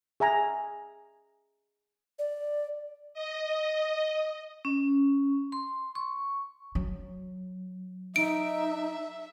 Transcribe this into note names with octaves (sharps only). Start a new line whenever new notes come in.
G#4 E5 G#5 A#5
D5
D#5
C#4
C6
C#6
F#3
D#4 E5 D7